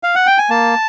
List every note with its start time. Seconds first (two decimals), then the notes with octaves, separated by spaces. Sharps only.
0.03 F5
0.15 F#5
0.27 G5
0.38 G#5
0.50 A#3 A5